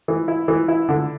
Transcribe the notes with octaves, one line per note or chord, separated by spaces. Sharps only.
E3
E4
E3
E4
D3